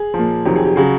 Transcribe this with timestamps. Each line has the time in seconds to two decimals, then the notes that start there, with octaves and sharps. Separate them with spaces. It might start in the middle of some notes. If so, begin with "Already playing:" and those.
Already playing: G#4
0.14 F3
0.19 A#2
0.45 F2 C3 D#3 F#3 G4
0.56 G#4
0.65 G4
0.76 C#3 F#3 G#4